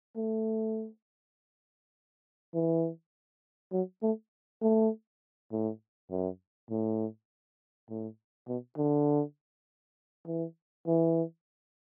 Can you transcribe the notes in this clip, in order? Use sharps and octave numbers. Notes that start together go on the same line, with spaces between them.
A3
E3
F#3
A3
A3
A2
F#2
A2
A2
B2
D3
E3
E3